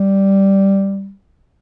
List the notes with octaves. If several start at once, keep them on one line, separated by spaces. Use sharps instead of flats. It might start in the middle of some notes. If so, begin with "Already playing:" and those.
Already playing: G3